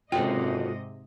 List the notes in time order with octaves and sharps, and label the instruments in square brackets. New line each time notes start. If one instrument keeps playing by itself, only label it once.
[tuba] F#1 [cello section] G#2 C3 D#5 [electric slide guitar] F4 F#4 A4 [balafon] G5